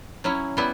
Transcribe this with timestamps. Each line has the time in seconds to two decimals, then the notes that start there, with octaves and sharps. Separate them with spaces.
0.24 F#3 C#4 E4
0.57 G3 B3 E4